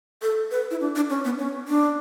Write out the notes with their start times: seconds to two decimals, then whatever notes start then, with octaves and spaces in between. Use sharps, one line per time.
0.22 A4
0.51 B4
0.71 E4
0.80 D4
0.96 D4
1.10 C#4
1.25 B3
1.39 C#4
1.68 D4